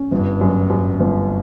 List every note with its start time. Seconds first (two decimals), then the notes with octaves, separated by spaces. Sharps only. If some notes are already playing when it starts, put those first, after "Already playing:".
Already playing: C#4
0.11 G1 G2
0.41 F#2
0.70 F#2
1.00 G1